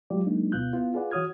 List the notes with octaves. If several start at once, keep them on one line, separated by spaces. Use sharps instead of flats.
F#3 G#3 F4 G4 D5
F#3 G#3 A#3 D4 D#4
D2 B2 B3 F4 F#6 G6
B3 E4 F4
F4 G#4 B4 D5 F#5
E3 F#4 C#5 D#6 F6 G#6